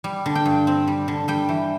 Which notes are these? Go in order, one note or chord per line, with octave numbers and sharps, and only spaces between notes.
G3
D3
G5
G2
C4
G3
D3
G3 G5
E3